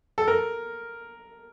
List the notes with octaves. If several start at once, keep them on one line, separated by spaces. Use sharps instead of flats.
A4
A#4